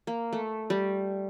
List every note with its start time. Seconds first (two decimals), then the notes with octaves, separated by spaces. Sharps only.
0.07 A#3
0.33 A3
0.70 G3